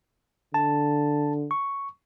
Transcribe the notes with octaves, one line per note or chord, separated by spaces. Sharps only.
D3 A5
C#6